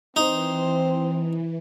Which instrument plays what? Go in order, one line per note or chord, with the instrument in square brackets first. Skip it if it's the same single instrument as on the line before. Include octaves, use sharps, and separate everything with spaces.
[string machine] E3 [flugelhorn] C4 [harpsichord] D#4 [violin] C5